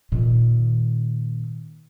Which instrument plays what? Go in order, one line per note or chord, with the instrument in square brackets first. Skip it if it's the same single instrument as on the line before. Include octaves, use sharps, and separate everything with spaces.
[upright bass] A#2 D#3